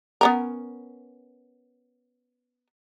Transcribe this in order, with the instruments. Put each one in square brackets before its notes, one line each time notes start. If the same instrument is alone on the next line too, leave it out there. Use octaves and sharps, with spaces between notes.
[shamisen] B3 C#4 A#4